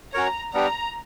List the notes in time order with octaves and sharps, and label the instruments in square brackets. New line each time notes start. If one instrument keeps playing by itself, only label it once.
[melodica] C#4 F#4 A#4 C#5 [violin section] A#5
[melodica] G3 B3 D4 G4 [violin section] A#5